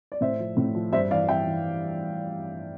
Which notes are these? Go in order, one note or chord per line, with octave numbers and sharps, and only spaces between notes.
D5
A2 C5 E5
F3
A2
F3
G2 C5 E5
E3 D5 F5
G2 E5 G5
E3